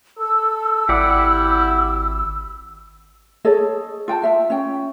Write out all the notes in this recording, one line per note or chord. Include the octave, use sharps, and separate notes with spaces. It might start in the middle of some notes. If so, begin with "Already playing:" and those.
A4 E6
G#1 E4 G4 D5 F#5
G#4 A4 C#5 D#5
F4 G5 A5
F4 E5 F#5
C#4 G5